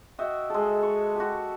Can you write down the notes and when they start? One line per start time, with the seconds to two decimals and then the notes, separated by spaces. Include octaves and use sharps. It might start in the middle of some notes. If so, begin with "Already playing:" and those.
0.19 F#4 D#5 E5 G5
0.50 G#3 A4
0.83 C#6
1.16 F#4 G4